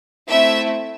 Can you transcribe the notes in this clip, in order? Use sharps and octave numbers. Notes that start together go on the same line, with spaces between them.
A3 C4 E4 E5